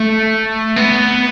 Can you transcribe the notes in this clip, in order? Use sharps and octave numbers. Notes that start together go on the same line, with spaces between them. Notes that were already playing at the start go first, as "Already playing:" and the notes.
Already playing: A3
B3